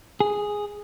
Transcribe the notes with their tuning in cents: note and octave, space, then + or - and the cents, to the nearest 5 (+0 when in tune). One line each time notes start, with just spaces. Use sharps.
G#4 -5